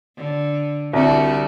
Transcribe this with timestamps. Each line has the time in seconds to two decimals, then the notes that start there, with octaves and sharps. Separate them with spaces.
0.17 D3
0.93 C2 D3 G3 F#4